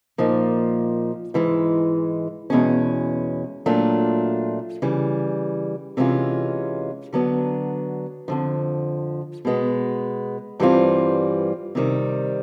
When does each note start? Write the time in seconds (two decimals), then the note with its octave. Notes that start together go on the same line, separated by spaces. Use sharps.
0.18 A#2 F3 A#3 D#4
1.34 G#2 E3 G#3
2.50 E2 B2 G#3 C#4
3.66 A#2 F#3 A3 D4 F4
4.82 C#3 E3 G3
5.97 C3 E3 G#3 C#4 F4
7.13 D3 F#3 B3 D4
8.28 F2 D3 F3
9.45 B2 G#3 B3
10.60 G2 E3 G3 C4 F4
11.75 C3 D#3 G3 C4